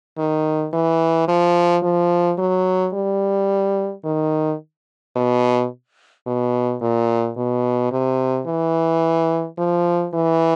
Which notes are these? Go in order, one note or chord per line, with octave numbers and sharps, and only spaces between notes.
D#3
E3
F3
F3
F#3
G3
D#3
B2
B2
A#2
B2
C3
E3
F3
E3